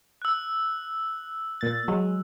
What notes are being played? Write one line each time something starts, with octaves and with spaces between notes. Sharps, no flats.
E6 F#6
A#2 A6
F#3 G#3